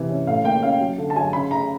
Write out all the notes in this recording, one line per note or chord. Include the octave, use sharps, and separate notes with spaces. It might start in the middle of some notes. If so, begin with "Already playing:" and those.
Already playing: C3 E3
C#4
A2 F5
A#3 G5
C#4 F5
F#3
D3
A5
F#3 G#5
C#3 B5
C#3 A#5